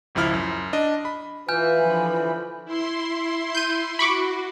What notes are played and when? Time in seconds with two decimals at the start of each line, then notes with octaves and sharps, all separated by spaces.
0.15 G#1 C#2 F3 E4 F6
0.34 F#2
0.73 D4 D#5
1.05 B5
1.49 E3 F4 B4 E5 G#5 F6 G6
1.78 D3 F3 B5
2.65 E4 C6
3.55 G6 D#7
3.99 F#4 B5 C#6 D6